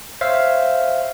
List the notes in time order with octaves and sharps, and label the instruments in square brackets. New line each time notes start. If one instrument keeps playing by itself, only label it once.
[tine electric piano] C5 C#5 E5 F5